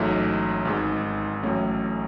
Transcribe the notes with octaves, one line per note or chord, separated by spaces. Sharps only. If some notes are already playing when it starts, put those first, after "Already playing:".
Already playing: A1 G#2 F#3 A3 E4
G#1 G#2 G#3
A1 A2 F#3 A3 C#4